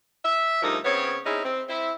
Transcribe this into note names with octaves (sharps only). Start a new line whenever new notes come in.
E5
D2 F3 G3 D#4 A#4 E5
C#3 B3 C4 C#5
C4 C#4 D#4 E4 G#4
C4
C4 E4 E5